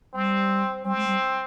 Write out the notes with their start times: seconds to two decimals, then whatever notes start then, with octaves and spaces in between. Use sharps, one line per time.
0.14 G3 C4
0.85 G3 C4
0.97 G#3
1.07 G3